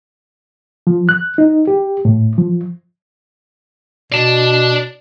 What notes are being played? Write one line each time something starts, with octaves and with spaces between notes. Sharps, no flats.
F3
F#6
D#4
G4
A2
F3
B2 D5 A5